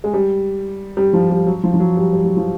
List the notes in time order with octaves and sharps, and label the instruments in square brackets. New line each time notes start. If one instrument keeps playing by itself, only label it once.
[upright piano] G#3
G3
G3
F3
G3
F#3
F3
F3
F#3
G3
G3
F#3
F3